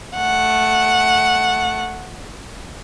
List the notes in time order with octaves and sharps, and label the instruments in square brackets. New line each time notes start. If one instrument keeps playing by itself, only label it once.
[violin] A3 F#5